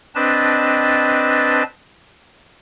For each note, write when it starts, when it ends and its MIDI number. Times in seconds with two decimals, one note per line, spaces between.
0.15 1.63 60
0.15 1.63 62
0.15 1.63 71
0.15 1.63 75
0.15 1.63 81